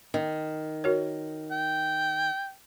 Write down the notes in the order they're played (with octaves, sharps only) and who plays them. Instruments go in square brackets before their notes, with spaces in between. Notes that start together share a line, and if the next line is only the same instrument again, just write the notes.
[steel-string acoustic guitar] D#3
[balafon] F#4 A#4 C#5
[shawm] G5